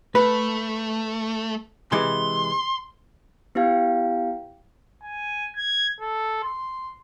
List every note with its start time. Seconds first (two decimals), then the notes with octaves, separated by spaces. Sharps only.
0.15 A3 B4
1.92 C3 E3 G#3 C6
3.55 B3 E4 G4 F5 G5
5.03 G#5
5.56 G#6
6.00 A4
6.43 C6